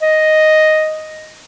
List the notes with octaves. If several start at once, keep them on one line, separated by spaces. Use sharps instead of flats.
D#5